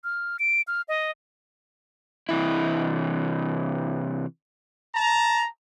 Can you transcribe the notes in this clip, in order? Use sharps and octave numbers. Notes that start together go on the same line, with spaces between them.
F6
D7
F6
D#5
C3 E3 E4
A5 A#5